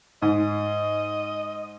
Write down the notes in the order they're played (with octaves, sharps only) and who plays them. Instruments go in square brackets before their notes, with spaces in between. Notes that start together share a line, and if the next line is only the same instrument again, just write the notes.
[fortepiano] G#2 [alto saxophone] D#5